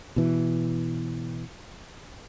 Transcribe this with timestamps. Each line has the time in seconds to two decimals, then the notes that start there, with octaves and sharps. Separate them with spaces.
0.16 B2 E3